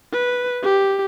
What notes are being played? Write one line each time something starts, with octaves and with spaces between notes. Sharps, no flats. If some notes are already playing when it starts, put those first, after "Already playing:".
B4
G4